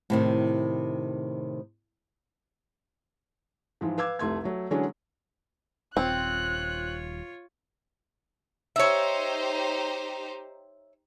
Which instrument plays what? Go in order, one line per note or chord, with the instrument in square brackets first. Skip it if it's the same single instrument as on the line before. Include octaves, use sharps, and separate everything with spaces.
[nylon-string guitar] A2 C3 D#3
[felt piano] G#2 E3 F3
B4 F5 D6 E6 G#6
F1 C2 A3 C6 G#6
F#3 A3
D3 E3 F#3 G#3 C#4 D4
[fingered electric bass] D#1 [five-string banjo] C4 [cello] F4 C#5 [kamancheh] F#6
[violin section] D#4 G4 C5 [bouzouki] C#5 E5